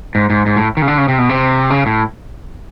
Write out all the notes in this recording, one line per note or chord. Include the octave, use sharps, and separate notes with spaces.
G#2
G#2
G#2
A2
D#3
C#3
D3
C#3
C3
B2
C3
C#3
A2